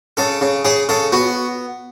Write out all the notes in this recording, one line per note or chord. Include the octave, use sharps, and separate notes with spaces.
C#3 A4
C#3
C#3 G#4
C#3 A4
B3 F#4